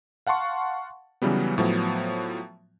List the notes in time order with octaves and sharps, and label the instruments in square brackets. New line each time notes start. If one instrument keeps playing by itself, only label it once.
[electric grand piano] F5 F#5 A5 C6 C#6
C#3 E3 F#3 G3 B3
A2 F3 F#3 B3